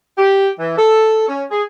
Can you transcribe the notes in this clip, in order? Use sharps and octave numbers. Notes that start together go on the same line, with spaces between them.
G4
E3
A4
C#4
G#4